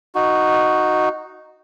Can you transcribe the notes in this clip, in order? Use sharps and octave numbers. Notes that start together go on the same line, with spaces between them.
D#4 F#4